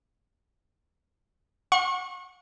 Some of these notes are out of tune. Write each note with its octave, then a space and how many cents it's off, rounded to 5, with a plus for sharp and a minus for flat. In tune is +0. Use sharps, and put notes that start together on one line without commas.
F#5 -35 C#6 -35